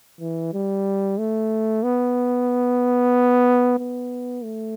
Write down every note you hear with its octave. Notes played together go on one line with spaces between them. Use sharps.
E3
G3
A3
B3
B3
A3